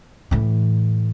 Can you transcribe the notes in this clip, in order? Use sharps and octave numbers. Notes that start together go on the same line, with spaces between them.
A2 E3